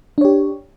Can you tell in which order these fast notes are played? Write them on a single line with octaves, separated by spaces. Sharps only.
D4 C#5 G4